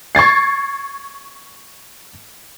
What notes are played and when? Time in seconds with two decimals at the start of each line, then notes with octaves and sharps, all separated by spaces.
0.15 C#6 G#6 A6 C7